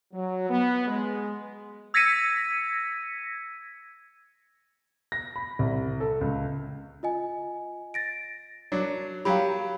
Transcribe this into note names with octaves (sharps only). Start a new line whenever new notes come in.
F#3
B3
G#3
E6 G#6 A#6 B6 C#7 D#7
A#6
B5
C2
A4
C#2
F4 D#5 G#5
A6 A#6 D7
F#3 D4 C#5
F#3 G4 F5 A#5 B5